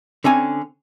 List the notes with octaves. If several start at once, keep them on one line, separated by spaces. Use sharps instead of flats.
D3 C4 C#4 G#5